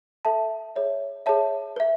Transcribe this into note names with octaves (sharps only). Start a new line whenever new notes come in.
A4 E5 A5
G#4 C#5 E5
G#4 C#5 E5 A5
B4 E5